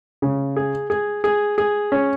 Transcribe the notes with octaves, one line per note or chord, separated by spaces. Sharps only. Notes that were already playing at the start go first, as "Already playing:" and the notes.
C#3
G#4
G#4
G#4
G#4
C#4